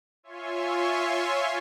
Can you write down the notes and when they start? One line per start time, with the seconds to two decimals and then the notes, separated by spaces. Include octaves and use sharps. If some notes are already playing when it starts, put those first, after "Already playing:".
0.23 F4 C#5 E5 G#5 C6 C#6